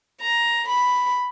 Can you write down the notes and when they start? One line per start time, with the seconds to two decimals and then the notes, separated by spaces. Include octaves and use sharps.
0.22 A#5
0.69 B5